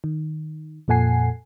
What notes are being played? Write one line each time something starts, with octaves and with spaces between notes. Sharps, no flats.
D#3
F2 A#2 A4 F#5 G#5 C7